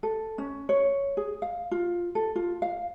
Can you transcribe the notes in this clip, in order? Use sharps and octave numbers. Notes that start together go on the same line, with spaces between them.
A4
C#4
C#5
G#4
F5
F4
A4
F4
F5